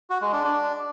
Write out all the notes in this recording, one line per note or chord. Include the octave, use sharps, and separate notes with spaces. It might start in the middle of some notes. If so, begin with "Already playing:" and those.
F#4
G#3
D4
D4